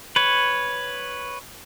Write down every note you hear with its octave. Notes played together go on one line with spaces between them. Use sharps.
B4 C#5